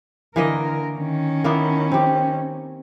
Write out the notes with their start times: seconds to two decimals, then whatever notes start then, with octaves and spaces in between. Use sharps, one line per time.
0.36 D3 E3 A#3 A#4 D#5
0.98 D#3 C#4
1.44 A#3 B3 E4
1.92 C4 G4